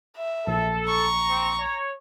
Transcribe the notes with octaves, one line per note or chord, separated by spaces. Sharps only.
E5
A#1 A4
A#5 C#6
C4
C#5